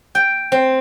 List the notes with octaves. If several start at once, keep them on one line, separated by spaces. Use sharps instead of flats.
G5
C4